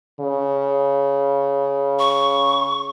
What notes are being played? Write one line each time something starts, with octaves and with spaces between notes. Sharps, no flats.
C#3
C#6